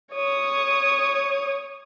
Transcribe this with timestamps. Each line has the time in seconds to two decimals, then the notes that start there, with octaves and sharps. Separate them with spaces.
0.15 C#5 D#6